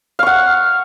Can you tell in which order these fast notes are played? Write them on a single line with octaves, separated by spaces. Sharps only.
F5 C#6 F#5